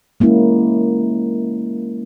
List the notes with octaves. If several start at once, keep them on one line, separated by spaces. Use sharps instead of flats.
G#3 A#3 C#4 E4